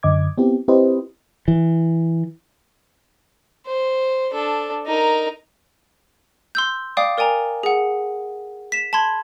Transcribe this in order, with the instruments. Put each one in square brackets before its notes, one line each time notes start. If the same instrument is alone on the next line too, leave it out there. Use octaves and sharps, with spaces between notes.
[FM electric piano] F#2 D3 D#5 D6 G#6
B3 C4 E4 G4
C4 E4 G4 B4 C5 D#5
[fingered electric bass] E3
[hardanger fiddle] C5
D4 A4
D#4 A#4
[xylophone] C6 E6 G6
D5 F5 G5 D6 D#6
A#4 D5 G5 G#5 A#5
G#4 F#5
B6 E7
A5 B5 C6 G#6